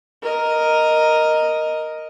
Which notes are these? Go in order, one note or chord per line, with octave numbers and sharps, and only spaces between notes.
A#4 D#5